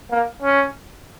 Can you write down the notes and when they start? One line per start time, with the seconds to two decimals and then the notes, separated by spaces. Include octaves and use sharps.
0.11 A#3
0.42 C#4